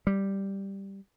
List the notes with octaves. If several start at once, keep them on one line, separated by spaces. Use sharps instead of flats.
G3